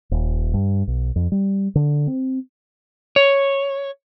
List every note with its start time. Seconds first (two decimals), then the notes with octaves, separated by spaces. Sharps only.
0.11 D#1
0.54 G2
0.87 B1
1.16 F2
1.32 G3
1.75 D3
2.07 C4
3.16 C#5